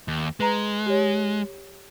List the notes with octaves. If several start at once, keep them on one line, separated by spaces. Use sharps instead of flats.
D#2
G#3 B4 A#5
G4 C#5